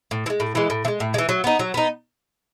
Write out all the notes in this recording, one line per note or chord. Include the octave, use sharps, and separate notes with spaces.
A2
E3
G#3
A2
E3 G#3
A2
E3
G#3
A2
G#3
E3
F#3
B3 D#4
F#3
B3 D#4